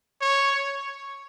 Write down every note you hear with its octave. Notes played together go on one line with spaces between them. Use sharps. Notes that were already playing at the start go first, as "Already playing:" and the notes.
C#5